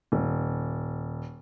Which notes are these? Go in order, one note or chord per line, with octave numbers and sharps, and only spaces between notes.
D#1